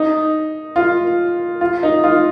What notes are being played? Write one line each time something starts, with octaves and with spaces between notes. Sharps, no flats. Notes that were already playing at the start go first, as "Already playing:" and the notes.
Already playing: D#4
F4
F4
D#4
F4